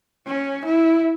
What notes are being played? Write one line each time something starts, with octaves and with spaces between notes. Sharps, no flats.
C#4
E4